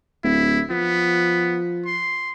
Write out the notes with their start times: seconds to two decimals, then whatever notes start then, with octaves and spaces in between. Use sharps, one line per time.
0.24 D1 E4
0.70 F3 B3
1.86 C6